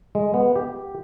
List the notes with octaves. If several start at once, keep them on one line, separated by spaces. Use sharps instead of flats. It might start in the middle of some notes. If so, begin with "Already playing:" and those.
G#3
B3
G4